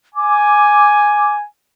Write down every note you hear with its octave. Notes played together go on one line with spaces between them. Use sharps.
G#5 D6